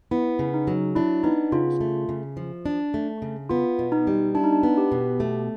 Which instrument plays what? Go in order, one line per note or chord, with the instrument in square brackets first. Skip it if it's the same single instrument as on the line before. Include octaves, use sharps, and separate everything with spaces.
[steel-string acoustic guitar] B3 [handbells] E4
[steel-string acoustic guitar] C#3
[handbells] D#4
[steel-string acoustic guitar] F#3
[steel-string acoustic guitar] D4 [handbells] E4
[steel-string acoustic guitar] B3 [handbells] D#4
[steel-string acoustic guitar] C#3 [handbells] F4
[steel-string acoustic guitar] A3
C#3
F3
D4
A3
C#3
[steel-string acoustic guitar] B3 [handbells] F4
[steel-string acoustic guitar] B2
[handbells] D#4
[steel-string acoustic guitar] G3
[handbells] D4 [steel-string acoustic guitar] E4
[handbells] D#4
D4
[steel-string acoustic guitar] B3
[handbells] G4
[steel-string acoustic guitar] B2
A3